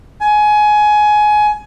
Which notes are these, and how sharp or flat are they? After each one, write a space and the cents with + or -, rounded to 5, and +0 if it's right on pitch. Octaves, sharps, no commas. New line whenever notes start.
G#5 +20